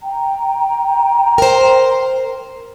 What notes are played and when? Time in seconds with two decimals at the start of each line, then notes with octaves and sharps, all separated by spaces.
0.02 G5 A#5
1.38 A#4 C5